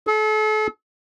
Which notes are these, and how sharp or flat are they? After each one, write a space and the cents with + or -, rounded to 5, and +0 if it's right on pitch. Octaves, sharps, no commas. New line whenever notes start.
A4 -40